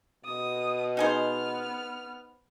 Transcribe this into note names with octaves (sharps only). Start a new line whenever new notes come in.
B2 D#6
B3 D#4 G#4 C5 F6